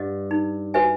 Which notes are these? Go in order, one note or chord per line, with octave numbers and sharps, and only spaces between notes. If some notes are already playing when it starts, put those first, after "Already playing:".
Already playing: G2 D#5 F#5
D#4
F#4 B4 E5 G#5